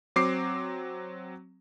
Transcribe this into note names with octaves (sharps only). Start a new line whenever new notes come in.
F#3 C4 D6 C7